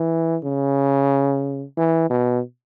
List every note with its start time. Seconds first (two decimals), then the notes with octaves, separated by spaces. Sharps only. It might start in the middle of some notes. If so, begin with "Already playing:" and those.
Already playing: E3
0.43 C#3
1.77 E3
2.10 B2